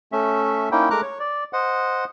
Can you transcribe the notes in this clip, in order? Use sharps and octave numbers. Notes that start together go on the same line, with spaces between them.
A3 C#4 E5
A#3 C#4 D#4 E4 G5
G#3 A3 A#4 A#5 D6 F#6
C#5
D5
C5 D#5 F#5